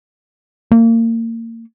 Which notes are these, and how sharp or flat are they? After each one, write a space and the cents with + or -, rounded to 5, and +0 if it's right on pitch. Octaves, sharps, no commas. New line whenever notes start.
A#3 -30